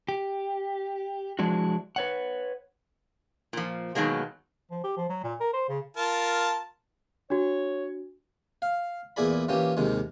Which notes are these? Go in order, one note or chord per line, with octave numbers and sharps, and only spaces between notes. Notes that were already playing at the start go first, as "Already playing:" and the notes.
G4
F3 G#3 D4 E4 F#4
B4 C#5 F#5
A#2 F3
B2 D#3 F#3 G#3 A#3
F3
G4
F3
F#3
A#2
A#4
C5
C#3
F4 A#4 A5
D4 F#4 C#5
F5
E2 A#2 E4 G#4 D5 B5
A#2 E3 A#3 C#4 G4
D#2 C3 D#3 G#3